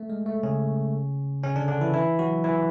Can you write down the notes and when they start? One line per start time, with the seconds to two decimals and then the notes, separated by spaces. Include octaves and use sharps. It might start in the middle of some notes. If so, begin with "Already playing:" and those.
Already playing: A3
0.10 G#3
0.26 A3
0.43 C#3 C#4
1.43 C#3 C#4
1.56 D3 D4
1.68 D3 D4
1.81 E3 E4
1.94 E3 E4
2.19 F#3 F#4
2.44 E3 E4